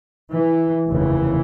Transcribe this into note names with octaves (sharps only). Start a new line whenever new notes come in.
E3
F1 D#2 C#3 E3